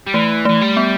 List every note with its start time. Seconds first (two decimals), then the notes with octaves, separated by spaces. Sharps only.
0.07 G3
0.14 E3 A3
0.45 E3 A3
0.61 G3
0.77 B3